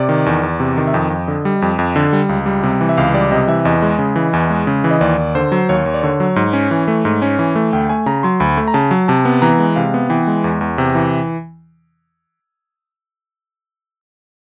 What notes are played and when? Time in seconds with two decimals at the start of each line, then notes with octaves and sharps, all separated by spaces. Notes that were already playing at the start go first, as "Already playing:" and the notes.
Already playing: C3 D5
0.09 D#3
0.26 E2
0.43 E2
0.60 C3
0.77 D#3
0.88 E5
0.93 F2 D#5
1.10 F2
1.28 D3
1.45 G3
1.62 F2
1.79 F2
1.96 D3
2.13 G3
2.29 C#2
2.46 G3
2.63 C3
2.81 E3
2.89 E5
2.97 C#2 F5
3.14 G3 D5
3.31 C3 D#5
3.48 E3 E5
3.65 E2 D#5
3.82 G#3
3.99 C#3
4.16 E3
4.33 E2
4.50 G#3
4.67 C#3
4.84 E3
4.91 D#5
5.01 D#2 D5
5.18 D#2
5.35 D3 C5
5.52 F#3
5.69 D#2 C#5
5.86 D#2
5.94 D5
6.03 D3 C#5
6.20 F#3
6.36 G#2
6.53 C#4
6.71 E3
6.88 A3
7.05 G#2
7.22 C#4
7.39 E3
7.56 A3
7.73 D2 G5
7.89 A3 G#5
8.06 C#3 A#5
8.23 F#3 C6
8.40 D2 B5
8.57 A3
8.68 A#5
8.74 C#3 A5
8.91 F#3
9.08 C3 A5
9.25 B3
9.42 E3 A#5
9.59 G#3
9.76 C3 F5
9.94 B3
10.10 E3 G5
10.27 G#3
10.44 E2
10.61 E2
10.78 C3
10.95 E3